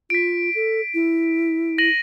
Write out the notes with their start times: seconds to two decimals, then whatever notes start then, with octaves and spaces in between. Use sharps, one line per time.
0.10 F4 B6 D7
0.55 A4
0.94 E4
1.78 A#6 D#7 F#7